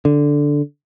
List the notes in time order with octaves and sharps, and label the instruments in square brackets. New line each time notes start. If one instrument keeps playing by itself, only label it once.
[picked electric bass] D3